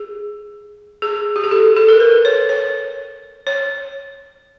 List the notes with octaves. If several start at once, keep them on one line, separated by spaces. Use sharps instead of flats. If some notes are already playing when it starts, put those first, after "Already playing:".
Already playing: G#4
G#4
G4
G#4
A4
A4
A#4
B4
C#5
C#5
C#5